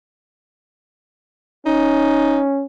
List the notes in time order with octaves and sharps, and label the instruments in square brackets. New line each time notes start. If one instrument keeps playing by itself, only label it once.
[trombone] C#4 [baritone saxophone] D#4